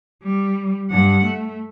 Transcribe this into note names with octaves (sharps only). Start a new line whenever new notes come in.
G3
G2 F#5
A3